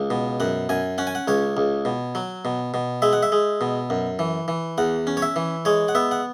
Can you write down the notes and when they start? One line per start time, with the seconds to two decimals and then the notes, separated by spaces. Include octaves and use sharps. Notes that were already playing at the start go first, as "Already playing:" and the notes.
Already playing: C#2
0.10 B2
0.40 F#2 F#5
0.69 F#2 G#5
0.98 C#4 F#5
1.07 G#5
1.15 F#5
1.28 C#2 C#5
1.57 C#2
1.85 B2
2.15 F#3
2.45 B2
2.74 B2
3.02 G#3 E5
3.13 F#5
3.23 E5
3.32 G#3
3.61 B2
3.90 F#2
4.19 E3
4.48 E3
4.78 E2 F#5
5.07 C#4
5.17 C#5
5.22 E5
5.36 E3
5.65 G#3 C#5
5.88 F#5
5.95 B3 E5
6.11 F#5